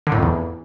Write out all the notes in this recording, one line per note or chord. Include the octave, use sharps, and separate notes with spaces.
D3
A2
F2
E2